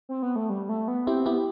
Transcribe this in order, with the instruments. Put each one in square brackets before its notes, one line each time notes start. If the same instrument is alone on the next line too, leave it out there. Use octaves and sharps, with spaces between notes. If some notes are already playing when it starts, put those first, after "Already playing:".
[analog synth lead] C4
B3
A3
G3
A3
B3
[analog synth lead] C4 [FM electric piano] E4 G4
[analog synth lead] B3 [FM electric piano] E4 G4